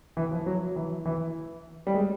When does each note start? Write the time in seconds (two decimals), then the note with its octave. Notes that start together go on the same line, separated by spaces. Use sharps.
0.17 E3
0.31 F3
0.46 F#3
0.76 E3
1.05 E3
1.87 G3
1.94 G#3